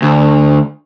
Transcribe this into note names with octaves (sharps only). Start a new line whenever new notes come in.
D2